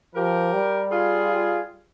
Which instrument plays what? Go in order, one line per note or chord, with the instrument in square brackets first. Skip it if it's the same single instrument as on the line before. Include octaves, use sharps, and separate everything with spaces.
[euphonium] F3 [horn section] G4 A#4
[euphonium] G3
[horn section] F4 G#4